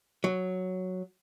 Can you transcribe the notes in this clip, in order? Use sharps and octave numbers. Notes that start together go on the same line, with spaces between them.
F#3